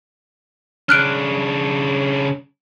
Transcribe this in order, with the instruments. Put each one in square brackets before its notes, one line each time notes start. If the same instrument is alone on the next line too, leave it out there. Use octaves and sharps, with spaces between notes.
[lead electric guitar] C#3 D4 [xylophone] F6 F#6 D7